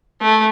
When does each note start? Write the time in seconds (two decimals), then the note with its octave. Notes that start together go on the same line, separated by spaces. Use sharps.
0.21 A3